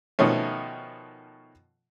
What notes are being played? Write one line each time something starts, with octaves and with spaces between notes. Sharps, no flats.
B2 D#3 F3 A3 C#4